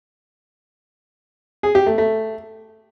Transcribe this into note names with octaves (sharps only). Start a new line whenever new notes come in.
G#4
G4
A3
A3